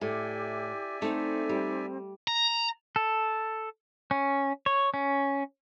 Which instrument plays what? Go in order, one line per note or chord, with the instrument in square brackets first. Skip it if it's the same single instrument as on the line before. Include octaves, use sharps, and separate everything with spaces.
[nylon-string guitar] A2 [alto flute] G4 [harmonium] D5 E5 G#5
[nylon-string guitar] A3 [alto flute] C4 [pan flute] D#4
[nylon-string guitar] G3
[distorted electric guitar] A#5
[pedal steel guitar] A4
C#4
C#5
C#4